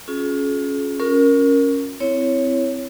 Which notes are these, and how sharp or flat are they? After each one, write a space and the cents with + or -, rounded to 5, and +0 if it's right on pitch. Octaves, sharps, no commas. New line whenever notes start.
C#4 +0 F4 +35 G#4 +40
C#4 +0 F4 +45 A#4 +0
C4 -10 E4 +5 C#5 +0